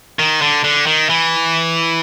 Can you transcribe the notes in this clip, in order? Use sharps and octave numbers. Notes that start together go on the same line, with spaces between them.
D#3
D3
D3
D#3
E3